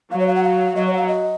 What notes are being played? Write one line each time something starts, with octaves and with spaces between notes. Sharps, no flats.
F#3 F5
C#5
F5
F#5
F5
F#3 D#5
C#5
F#5
F5
D#5